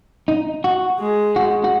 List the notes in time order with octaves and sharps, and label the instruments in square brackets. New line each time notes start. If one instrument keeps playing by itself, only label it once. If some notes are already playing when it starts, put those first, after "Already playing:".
[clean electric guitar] D#4
F#4
[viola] G#3
[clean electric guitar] F#4
F#4